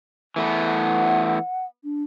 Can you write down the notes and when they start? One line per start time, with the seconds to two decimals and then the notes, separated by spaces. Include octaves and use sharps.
0.36 E3 A3 B3
0.65 F#5
1.84 D4